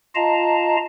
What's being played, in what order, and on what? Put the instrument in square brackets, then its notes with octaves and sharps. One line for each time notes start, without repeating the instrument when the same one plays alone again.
[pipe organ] F4 D#5 F5 A5 A#5